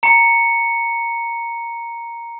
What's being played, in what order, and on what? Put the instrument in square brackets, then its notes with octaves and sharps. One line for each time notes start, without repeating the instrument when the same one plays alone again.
[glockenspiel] A#5 C#7